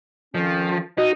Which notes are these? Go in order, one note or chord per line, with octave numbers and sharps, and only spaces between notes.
F2 D#3 F3 C#4
D#4 F#4 D#5